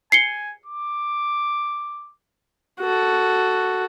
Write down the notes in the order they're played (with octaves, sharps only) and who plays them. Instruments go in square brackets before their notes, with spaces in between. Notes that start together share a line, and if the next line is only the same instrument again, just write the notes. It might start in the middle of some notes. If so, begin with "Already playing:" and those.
[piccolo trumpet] G#5 [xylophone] C7 C#7 G7
[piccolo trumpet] D6
[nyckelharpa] F#4 A4